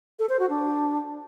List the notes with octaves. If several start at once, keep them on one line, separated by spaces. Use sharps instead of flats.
A4
C5
F#4
D4